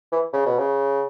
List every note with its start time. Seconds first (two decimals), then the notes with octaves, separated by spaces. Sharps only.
0.12 E3
0.33 C#3
0.46 B2
0.58 C#3